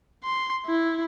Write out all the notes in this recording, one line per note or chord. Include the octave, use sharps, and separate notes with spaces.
C6
E4